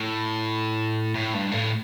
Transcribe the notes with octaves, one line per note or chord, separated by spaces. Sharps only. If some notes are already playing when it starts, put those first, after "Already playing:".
Already playing: A2
A2
G2
A2